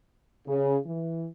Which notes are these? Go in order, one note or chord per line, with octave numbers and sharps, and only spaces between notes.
C#3
E3